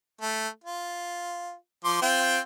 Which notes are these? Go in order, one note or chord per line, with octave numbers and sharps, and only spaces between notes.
A3
F4
F3 C6 D6
C4 F4 G5